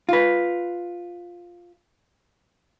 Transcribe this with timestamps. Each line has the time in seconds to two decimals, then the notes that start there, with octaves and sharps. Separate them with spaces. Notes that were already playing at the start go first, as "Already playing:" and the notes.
0.09 F4 B4